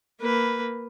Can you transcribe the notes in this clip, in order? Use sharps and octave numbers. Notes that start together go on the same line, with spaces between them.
A#3 B4